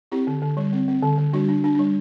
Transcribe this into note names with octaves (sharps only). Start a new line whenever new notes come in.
C4 E4 G4
D3
D3
G3
C4
C4
D3
D3
G3 D4 F#4
D4
D4
G3 D4